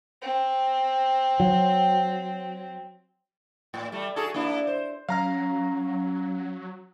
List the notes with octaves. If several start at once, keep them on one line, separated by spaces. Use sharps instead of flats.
C4
F#3
A2
G3 A3
F#4 G#4 A4
A#3 D4 E4
C5
F#3 C#4 F5 A#5 F6